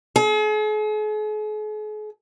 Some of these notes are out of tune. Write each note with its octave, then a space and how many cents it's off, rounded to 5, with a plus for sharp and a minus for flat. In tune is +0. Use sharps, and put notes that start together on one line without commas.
G#4 +45